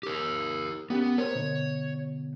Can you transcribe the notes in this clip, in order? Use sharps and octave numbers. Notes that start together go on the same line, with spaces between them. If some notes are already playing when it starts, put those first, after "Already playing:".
G4 A#4
A#3 B3 C#4 G4
A#4 C5 C#5
B2 D3 B3